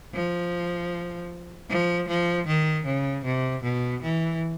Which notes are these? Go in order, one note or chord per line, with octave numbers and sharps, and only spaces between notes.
F3
F3
F3
D#3
C#3
C3
B2
E3